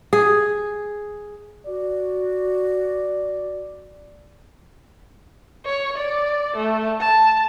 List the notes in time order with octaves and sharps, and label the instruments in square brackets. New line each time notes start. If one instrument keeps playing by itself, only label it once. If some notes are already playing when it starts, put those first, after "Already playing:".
[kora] G#4
[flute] F#4 [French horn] D5
[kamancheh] C#5
D5
A3
A5